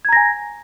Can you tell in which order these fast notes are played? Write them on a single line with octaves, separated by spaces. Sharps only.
G#6 A#5 A#6 G#5